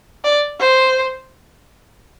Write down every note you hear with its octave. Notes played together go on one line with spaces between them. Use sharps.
D5
C5